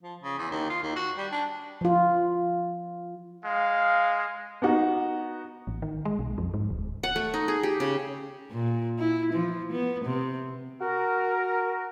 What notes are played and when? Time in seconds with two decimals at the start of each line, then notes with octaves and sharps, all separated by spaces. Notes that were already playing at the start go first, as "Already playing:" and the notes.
0.03 F3
0.23 C#3
0.38 E2
0.51 D#2
0.70 F4
0.83 D#2
0.96 F#4
1.17 G3
1.32 D4
1.81 F3 F4
3.45 G#3 F5
4.62 B3 D#4 F#4
5.67 A1
5.82 D#3
6.05 G#3
6.19 B1
6.38 F2
6.54 G#2
6.70 D1
7.03 F#5
7.16 A3
7.34 D#4
7.48 G#4
7.63 G4
7.80 C#3
8.51 A#2
8.98 E4
9.33 F3
9.72 B3
10.05 C3
10.81 F#4 A#4